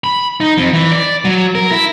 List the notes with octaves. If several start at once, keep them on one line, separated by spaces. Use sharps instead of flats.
B5
D#4
F2
E3
D5
F#3
A#4
E4